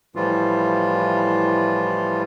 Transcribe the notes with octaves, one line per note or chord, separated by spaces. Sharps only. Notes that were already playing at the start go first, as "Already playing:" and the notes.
A2 E3 F3 G3 F4